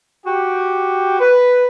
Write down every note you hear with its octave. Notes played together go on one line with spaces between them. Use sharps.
F#4 G4
B4